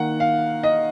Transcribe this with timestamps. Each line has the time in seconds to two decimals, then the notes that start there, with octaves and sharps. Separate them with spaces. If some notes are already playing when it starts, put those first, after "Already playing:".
Already playing: D#3 A#3 F#5
0.20 F5
0.63 D#5